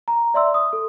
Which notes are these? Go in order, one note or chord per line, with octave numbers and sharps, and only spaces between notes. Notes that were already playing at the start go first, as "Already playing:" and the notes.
A#5
D5 E5 C6 E6
D#6
A4